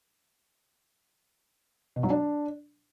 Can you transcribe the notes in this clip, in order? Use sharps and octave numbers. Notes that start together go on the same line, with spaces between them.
B2
F#3
D4